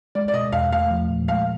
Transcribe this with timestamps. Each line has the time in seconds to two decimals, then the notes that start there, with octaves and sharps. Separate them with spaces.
0.15 G#3 D5
0.28 D5
0.34 B2 D#5
0.52 E2 F5
0.72 A3 F5
0.91 F3
1.10 A#2
1.28 G#3 F5